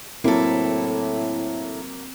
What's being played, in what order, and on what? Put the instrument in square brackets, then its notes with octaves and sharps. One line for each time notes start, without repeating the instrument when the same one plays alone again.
[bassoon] A2 [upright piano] F#3 A#3 [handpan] C4 [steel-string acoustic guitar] E4 A4